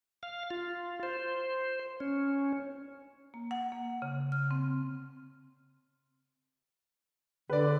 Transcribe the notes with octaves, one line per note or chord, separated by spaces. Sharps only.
F5
F4
C5
C#4
A#3
F#5
A#3
C#3
F6
C4
D3 B4 D5